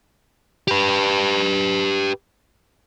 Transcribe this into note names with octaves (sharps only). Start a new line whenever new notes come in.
G4 B4